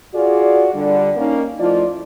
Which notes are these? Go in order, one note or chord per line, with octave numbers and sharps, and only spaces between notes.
F4 F#4 G#4 D5
D3 G3 D5
A#3 C#4 D#4
F3 A3 E4 F4 D5 D#5